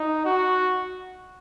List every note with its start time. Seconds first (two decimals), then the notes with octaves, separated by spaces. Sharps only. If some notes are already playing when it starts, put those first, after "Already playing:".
Already playing: D#4
0.25 F#4